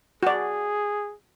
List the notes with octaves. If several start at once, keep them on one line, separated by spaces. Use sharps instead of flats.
F#4 G#4 D5